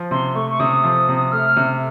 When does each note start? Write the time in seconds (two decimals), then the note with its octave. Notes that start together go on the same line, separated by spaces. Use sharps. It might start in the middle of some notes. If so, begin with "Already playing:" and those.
Already playing: F3
0.11 C3 C6
0.35 A3 C#6
0.51 C#6
0.60 C3 D#6
0.84 F3
1.09 C3
1.32 A3 F6
1.56 C3